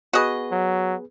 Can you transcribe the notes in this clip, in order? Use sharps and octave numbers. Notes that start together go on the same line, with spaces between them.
B3 F#4 G#4 B4 D#5
F#3